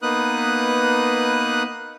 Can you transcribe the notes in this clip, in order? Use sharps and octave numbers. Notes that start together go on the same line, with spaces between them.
A#3 B3 D#4 B4 D#6 F#6